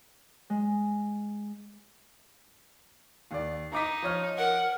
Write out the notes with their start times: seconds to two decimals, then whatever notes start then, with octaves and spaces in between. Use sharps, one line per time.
0.50 G#3
3.31 D#2 D5
3.73 D#4 A#5 D6 B6
4.02 F3 C#5 F6
4.38 A#4 F#5